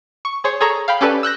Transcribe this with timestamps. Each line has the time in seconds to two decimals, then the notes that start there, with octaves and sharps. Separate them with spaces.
0.25 C#6
0.44 G#4 C5 C#5
0.60 G#4 A4 C#5 A#5
0.88 F5 G5 B5
1.01 C#4 G4 A4 B4 D5
1.23 E6 F#6 G6 A#6